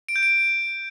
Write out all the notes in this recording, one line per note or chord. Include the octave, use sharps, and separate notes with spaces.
D7
G6
D7